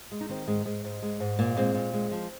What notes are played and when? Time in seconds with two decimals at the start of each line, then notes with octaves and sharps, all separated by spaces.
0.12 G#3
0.21 D#4
0.29 D#3 C4
0.47 G#2 G#3
0.65 G#2 G#3
0.84 G#2
1.02 G#3
1.20 G#2
1.39 A#2 A#3
1.57 G#3 C4
1.74 A#2
1.94 G#3
2.11 F3